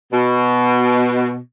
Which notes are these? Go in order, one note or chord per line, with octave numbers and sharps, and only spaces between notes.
B2